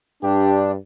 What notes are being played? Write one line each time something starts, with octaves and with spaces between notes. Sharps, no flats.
G2 D4 G4